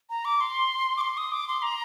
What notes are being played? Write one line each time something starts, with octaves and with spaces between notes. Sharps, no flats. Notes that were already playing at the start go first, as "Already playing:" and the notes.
A#5
D6
C6
D6
C6
D#6
D6
C6
A#5